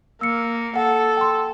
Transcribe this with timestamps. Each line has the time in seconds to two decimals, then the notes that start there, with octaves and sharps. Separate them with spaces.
0.21 A#3 E6 C#7
0.76 A4 F#5
1.17 G5 C6